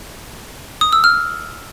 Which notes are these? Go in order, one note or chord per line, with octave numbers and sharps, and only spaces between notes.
D#6
E6
F6